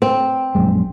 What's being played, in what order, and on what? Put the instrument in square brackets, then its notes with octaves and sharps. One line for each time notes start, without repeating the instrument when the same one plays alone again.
[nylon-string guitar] C4
[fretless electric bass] A#1 F#2 G#3